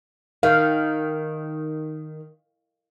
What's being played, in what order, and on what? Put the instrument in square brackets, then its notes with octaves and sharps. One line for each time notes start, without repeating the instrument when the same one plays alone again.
[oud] D#3 [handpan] F5